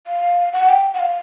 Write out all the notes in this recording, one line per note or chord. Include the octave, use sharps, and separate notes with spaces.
F5
F#5
G5
F#5
F5